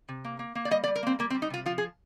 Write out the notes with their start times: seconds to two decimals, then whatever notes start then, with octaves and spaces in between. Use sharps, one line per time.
0.08 C3
0.25 A#3
0.39 A#3
0.55 A#3
0.65 D5
0.71 G3 D#5
0.84 D5
0.88 G3
0.96 A#4
1.03 A#3 C4
1.19 G3 A#3
1.30 C4
1.34 G3
1.42 D#4
1.50 C3 F4
1.66 F3 F4
1.78 G#4